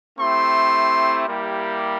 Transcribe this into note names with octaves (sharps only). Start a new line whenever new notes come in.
A3 C4 E4 G4 C6
G3 A#3 E4 G4